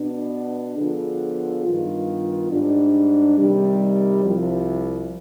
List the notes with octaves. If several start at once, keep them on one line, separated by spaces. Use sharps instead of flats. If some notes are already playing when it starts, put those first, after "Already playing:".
Already playing: B2 B3 D4
D3 F3 B3 F4 G#4
G2 D#3 B3 F4
G#2 G3 D4
C3 D#3 G3
C2 C3 F3